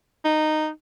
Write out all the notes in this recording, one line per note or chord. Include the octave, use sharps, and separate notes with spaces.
D#4